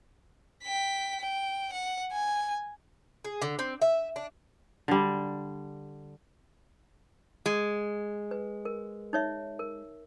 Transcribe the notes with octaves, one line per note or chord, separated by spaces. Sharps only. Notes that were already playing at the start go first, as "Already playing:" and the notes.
G5 B6
G5
F#5
G#5
G#4
D3
C4
E5
D4
D3 G3
G#3
B4
A#4
D#4 C#5 E5
A#4